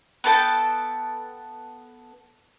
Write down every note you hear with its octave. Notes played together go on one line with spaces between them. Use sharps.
B3 A4 G5 A5